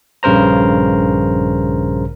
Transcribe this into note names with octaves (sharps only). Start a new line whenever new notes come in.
A#1 G2 C#3 A#4 C5 A#5